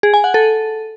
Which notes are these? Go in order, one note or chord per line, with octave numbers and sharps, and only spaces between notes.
G#4
G#5
F#5
A4